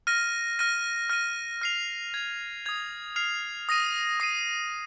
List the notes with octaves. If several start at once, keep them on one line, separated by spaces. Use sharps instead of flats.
F6 A#6 D#7
F6 A#6 D#7
F6 A#6 D#7
F6 C7 F7
G#6 F7
D#6 G#6 F7
F6 C7 F7
D#6 A#6 D#7
D#6 C7 D#7